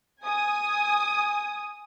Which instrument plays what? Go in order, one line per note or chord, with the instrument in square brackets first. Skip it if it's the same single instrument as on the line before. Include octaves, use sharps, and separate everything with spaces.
[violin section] G#5 D#6